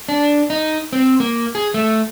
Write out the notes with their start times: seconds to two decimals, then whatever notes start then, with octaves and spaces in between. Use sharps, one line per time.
0.09 D4
0.50 D#4
0.93 C4
1.20 A#3
1.55 G#4
1.74 A3